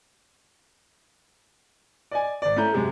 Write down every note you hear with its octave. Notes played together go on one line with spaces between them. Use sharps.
D5 D#5 G#5
G#1 D5
A3 C#4 E4 A#5 G6
F#2 C3 G#3